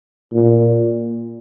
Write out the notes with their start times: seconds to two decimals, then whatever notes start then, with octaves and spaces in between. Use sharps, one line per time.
0.33 A#2